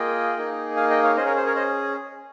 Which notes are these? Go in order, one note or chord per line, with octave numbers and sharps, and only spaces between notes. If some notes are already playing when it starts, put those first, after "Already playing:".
Already playing: A#3 F4 G#4 D#5 G5
A#3 D#4 G#4
F5 G#5
D#5 G5
C#5 F5
C#4 G#4 C5 D#5
A#4 C#5
C5
A#4 C#5
C5 D#5